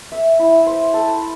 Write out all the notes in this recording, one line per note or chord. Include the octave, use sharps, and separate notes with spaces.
E5
E4
C5
A4